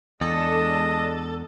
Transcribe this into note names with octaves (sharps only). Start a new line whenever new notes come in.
E2 G#3 D4 A4 D#5 A5